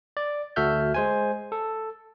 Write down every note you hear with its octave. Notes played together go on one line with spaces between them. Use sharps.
D5
D2 F#4 A4 E5 F6 G6
G#3 C5 G#5
A4